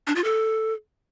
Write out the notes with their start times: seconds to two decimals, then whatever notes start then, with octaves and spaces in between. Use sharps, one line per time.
0.07 D4
0.16 F4
0.24 A4